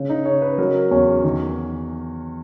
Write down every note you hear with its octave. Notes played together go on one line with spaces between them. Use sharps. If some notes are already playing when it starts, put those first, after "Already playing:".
Already playing: C#3
D#4
C#3 C#5
B4
F#3 A#4
E2 C#4
D#3